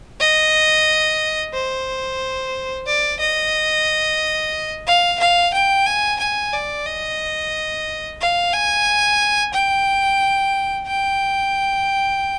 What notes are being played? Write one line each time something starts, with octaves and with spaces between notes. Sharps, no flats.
D#5
C5
D5
D#5
F5
F5
G5
G#5
G#5
D5
D#5
F5
G#5
G5
G5